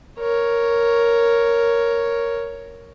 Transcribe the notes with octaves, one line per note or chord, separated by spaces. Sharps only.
A#4 C#5